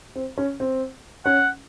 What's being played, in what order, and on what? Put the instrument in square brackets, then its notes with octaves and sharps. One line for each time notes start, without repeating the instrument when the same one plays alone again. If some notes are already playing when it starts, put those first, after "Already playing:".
[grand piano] C4
C#4
C4
[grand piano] C#4 [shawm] F#5